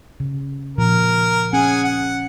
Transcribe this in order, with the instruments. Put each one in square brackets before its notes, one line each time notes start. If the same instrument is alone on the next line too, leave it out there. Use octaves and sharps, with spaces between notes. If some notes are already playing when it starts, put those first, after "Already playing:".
[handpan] C#3
[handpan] A#2 F3 [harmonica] A#4
[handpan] C#4 [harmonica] G#4 F#5 G#5
[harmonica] F#5